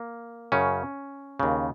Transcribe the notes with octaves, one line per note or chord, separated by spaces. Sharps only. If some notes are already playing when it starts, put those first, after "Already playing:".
Already playing: A#3
F#2 C#3 C#4
D#2 C#3